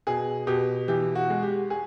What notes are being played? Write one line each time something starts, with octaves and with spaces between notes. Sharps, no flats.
B2 G#4
B2 G4
E3 G4
F#4
G#3
G4
G#4